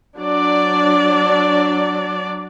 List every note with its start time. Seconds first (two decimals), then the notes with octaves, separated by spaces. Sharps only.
0.17 F#3 D4 D5